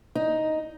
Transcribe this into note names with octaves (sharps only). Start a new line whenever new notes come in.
D#4